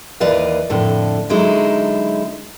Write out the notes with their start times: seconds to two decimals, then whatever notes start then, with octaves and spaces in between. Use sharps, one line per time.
0.20 D#2 E3 B4 D5 D#5 F5
0.70 F2 A2 D3
1.29 D3 F#3 G#3 D#4 E4